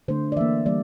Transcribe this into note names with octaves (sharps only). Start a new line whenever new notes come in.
D3 A3 C5
D5
E3 A#3 E5
E3 G3 A#3 D5